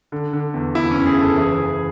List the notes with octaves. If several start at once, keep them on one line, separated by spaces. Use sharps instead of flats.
D3
D3
E2
E2 E4
F#1 C#4
G#4
F#1 A4
E3 G#4
E3